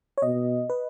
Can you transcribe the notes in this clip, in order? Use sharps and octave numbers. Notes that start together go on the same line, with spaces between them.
C#5
B2 D#5
B4